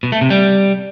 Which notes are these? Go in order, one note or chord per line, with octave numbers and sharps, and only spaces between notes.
B2
A3
C3
G3